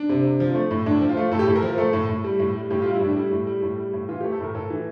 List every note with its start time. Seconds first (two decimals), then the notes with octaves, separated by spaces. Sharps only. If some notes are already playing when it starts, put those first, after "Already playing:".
Already playing: D4
0.09 C3
0.25 C3
0.40 F3
0.55 A3
0.71 A2
0.86 A2 D4
1.01 F3
1.09 F4
1.17 A3
1.32 A2 A4
1.39 G4
1.47 A2 A4
1.56 A#4
1.62 F3
1.78 A3 A4
1.93 A2
2.09 A2
2.24 G3
2.39 A2
2.56 G3
2.70 A2 G4
2.82 F4
2.86 G3
2.94 E4
3.01 A2 D4
3.17 G3 E4
3.32 A2
3.47 G3
3.62 A2
3.78 G3
3.93 A2
4.09 E3 F4
4.20 G4
4.24 A3
4.32 A4
4.40 A2 A#4
4.55 A2 A4
4.70 E3